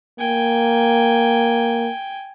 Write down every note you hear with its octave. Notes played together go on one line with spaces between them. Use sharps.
A#3 G5 G#5